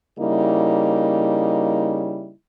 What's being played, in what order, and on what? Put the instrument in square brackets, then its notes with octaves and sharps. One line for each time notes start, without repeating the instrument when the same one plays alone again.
[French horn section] C#3 G3 A#3 D#4 E4